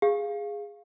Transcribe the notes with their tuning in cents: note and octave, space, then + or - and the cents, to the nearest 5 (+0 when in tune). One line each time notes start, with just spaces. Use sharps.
G#4 -5 F5 +0